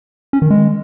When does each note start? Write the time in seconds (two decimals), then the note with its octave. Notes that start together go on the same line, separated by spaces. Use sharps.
0.33 C#4
0.42 D#3
0.50 G#3